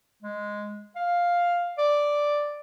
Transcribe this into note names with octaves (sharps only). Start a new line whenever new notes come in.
G#3
F5
D5